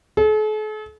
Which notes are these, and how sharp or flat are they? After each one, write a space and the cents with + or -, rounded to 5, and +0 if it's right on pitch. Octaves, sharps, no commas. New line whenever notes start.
A4 -45